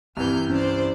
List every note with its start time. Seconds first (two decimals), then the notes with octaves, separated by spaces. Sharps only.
0.17 C2 G2 C3 E3 F6 G6
0.50 C#4 C5 D5